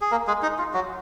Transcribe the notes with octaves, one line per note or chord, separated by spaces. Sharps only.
G#4
A#3 A#4
G#3 G#4
D#4
F4
F#3 F#4